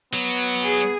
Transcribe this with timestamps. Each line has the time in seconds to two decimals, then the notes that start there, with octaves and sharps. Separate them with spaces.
0.13 F#3 B3
0.60 G#4